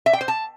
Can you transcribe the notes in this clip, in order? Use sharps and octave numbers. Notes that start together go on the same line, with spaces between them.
E5
G5
C5
A5